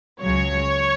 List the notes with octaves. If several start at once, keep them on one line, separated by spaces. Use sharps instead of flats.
C#2 C#3 F#3 C#5